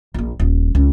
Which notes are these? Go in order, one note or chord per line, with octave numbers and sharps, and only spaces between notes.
A#1 A#3
D#1
C#2